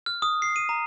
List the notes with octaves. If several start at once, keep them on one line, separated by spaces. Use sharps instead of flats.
F6
D#6
C7
D#7
A#5